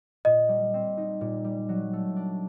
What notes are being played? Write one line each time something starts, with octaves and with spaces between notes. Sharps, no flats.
A#2 D#5
G3
C4
D#4
A#2
G3
F#3
A3
D4